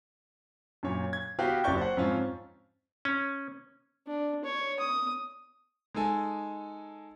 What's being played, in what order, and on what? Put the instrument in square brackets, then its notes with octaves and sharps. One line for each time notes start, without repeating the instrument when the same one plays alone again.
[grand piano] F#2 A#2 C#5
G#6
B3 F#4 G4 B4 F5 G5
F#1 F#3 G4 D5 C#6 G6
C5 F#5
F2 G#2 C#4 F4
[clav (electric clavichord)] C#4
[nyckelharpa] D4
C#5
D#6
[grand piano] G#3 D#4 A4 G#5